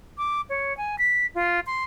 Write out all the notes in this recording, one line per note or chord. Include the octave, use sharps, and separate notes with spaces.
D6
C#5
G#5
B6
F4
C6